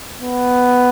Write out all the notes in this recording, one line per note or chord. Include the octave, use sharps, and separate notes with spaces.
B3